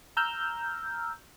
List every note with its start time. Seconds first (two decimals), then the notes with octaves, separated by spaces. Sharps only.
0.17 A#5 E6 F6 G6